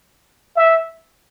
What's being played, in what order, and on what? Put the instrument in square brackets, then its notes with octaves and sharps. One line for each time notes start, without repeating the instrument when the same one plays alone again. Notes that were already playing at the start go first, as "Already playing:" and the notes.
[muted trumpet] E5